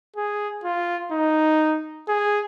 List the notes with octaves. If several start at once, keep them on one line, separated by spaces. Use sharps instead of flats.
G#4
F4
D#4
G#4